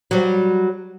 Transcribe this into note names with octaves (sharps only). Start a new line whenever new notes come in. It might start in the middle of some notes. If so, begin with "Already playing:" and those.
F#3 G3